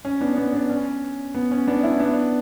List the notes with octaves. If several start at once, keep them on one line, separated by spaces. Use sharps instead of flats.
C#4
B3 D4
B3 D4
B3 D4
C#4
B3
C#4
B3 D4
C#4 E4
B3 D4